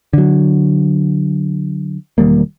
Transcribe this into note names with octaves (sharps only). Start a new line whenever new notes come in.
D3 F#3
E1 D#3 G3 A#3